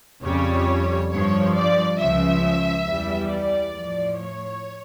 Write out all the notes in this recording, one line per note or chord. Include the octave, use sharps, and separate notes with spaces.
F2 C#3 G3 C#5
G2 F3 C#5
D5
C#2 C#3 F3 E5
E2 E3 G3
D5
A2 F3
C#5